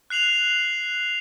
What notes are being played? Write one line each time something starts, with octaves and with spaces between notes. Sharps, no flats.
F#6 C7 F7 F#7